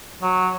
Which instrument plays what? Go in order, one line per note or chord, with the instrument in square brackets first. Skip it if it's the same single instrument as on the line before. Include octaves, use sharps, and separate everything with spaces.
[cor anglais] F#3